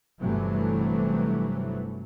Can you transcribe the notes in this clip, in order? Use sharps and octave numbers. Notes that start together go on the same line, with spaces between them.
G1 G2 C3 E3 F#3 A3